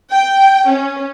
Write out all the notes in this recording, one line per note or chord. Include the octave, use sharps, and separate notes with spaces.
G5
C#4